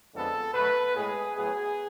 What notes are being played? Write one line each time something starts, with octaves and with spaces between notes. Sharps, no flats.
F2 D3 G#3 B3 A4
B2 F#3 A3 B4
A2 G#3 B3 G#4
A2 F#3 B3 G#4